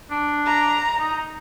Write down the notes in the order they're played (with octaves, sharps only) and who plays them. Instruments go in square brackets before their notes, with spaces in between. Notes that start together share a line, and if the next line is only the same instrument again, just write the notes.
[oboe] D4
[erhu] A#5
[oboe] D#4